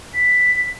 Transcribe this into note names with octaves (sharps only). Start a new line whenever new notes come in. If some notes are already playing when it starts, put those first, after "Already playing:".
B6